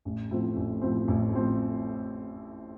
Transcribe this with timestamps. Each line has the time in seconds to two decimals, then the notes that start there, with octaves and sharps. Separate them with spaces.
0.05 A1
0.31 A2 F3 C4
0.57 A1
0.82 A2 F3 C4
1.08 A1
1.33 A2 F3 C4